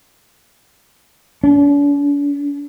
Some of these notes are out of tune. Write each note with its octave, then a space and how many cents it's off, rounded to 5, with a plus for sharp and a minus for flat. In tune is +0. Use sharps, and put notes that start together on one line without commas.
D4 -45